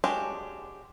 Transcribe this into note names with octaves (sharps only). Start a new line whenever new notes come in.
G#3 C#4 D4 F#4 G4